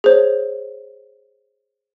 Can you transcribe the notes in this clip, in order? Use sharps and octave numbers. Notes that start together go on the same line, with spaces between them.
G#4 C5 C#5